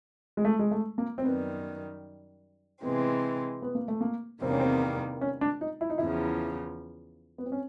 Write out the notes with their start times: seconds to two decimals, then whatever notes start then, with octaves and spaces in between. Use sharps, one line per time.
0.37 G#3
0.45 A3
0.59 G#3
0.71 A3
0.98 A#3
1.18 C4
1.24 F#2 D#3 G3 B3
2.83 C3 E3 G#3 B3 C4
3.62 B3
3.75 A#3
3.88 A3
4.01 A#3
4.41 E2 C3 D#3 G3 A#3 C4
4.51 C#4
4.60 C4
5.21 C#4
5.41 D4
5.61 D#4
5.81 E4
5.90 D#4
5.98 E2 C#3 F3 E4
7.38 B3
7.46 C4
7.52 C#4